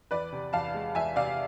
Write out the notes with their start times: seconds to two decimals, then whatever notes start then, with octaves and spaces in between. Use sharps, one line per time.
0.11 E2 B4 D5
0.32 C3
0.53 E2 F5 A5
0.74 G#3
0.95 E2 E5 G#5
1.16 C3 D5 F5